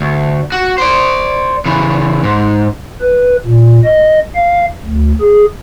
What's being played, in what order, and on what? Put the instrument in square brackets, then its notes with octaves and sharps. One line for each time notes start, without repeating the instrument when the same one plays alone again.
[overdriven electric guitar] D2
F#4
C5 D5
C#3 E3
G#2
[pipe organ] B4
A#2
D#5
F5
D2
G#4